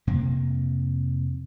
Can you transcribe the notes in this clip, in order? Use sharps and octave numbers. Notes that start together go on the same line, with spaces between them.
F2 C3 A#3